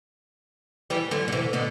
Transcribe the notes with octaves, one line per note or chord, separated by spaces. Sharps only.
E3 G3
D3 F#3
D3
C3 E3
B2 D3